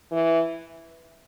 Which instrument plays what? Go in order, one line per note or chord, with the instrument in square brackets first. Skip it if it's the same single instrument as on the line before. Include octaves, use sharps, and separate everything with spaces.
[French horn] E3